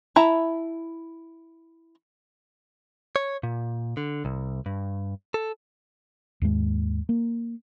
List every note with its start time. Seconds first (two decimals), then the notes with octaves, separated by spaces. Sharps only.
0.16 E4 E5 A5 A#5
3.16 C#5
3.43 A#2
3.97 D3
4.25 C2
4.66 G2
5.34 A4
6.42 D#2 G#2 G#3
7.09 A#3